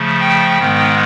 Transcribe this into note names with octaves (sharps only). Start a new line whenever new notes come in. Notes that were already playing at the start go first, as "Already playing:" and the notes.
Already playing: C#3 F3 A3
G5
G#2 D#3 G#3 B3